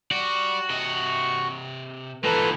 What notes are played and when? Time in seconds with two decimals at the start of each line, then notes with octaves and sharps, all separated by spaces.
0.11 F#4 G4 D5
0.70 C3 D#5
2.24 A#2 E3 D#4 A4 B4 C5